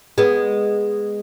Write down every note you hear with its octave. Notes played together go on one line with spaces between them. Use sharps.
G#3 B3